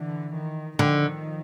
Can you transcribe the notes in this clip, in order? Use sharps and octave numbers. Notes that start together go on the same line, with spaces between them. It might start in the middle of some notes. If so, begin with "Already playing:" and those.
Already playing: D3 E3
D#3
D3 D#3 F3